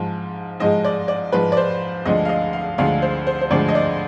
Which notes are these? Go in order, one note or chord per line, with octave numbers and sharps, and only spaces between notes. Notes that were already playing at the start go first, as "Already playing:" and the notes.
Already playing: G#2 F3 G#3
G#2 F3 G#3 D#5
D5
D5
G#2 F3 G#3 B4
D5
C5
D2 D3 F3 G#3 D#5
F5
D#5
F5
D2 D3 F3 G#3 F5
C5
C5
C5
D2 D3 F3 G#3 D5
D#5
D5